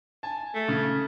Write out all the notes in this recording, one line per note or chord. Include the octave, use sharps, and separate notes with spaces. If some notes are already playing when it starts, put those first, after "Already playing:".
G#5 A5
A3
C#3